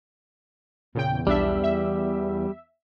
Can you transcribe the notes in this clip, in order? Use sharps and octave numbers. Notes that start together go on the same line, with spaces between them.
E2 A#2 C#3 G5
B1 G3 D4 E5
E5